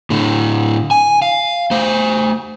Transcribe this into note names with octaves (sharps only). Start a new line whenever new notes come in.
A2 D3
G#5
F5
A3 C5